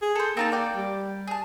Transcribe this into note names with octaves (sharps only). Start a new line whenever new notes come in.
G#4
A4 C5
A#3 C4 D#4 A5
D5 G5
G3
G#4 A5